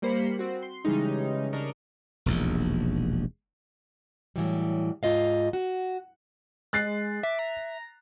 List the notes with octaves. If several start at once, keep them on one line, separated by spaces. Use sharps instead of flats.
G3 A#3 C5 B5 C#7
C4 F#4
C6
C#3 E3 G3 G#3 C#4 D#4
C#3 D4 A#4 D#5 C#6
E1 A#1 D#2
A2 E3 F#3 G3
G#2 F4 D#5 F5
F#4
G#3 F#6 A6 C7
E5 D6
A#5